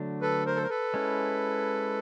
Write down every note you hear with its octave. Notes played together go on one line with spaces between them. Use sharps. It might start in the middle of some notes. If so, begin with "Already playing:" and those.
Already playing: D3 F#3 A3 D4
A4 B4
A#4 C5
A4
A#4
A4 B4
G#3 C#4 E4